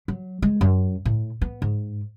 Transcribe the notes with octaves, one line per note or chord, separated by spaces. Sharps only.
F#3
G#3
F#2
A2
B3
G#2